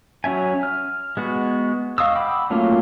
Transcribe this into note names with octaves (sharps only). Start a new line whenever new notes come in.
F#3 C#4 E5 G#5
F6
G#3 B3 F#4
D#5 F5 C#6 D#6 E6
F#5 G5 B5 D6 E6
F#3 A3 A#3 C#4 F4